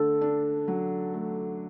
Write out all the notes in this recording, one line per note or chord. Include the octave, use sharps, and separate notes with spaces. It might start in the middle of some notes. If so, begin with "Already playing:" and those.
Already playing: D3 A4
D4
F#3
A3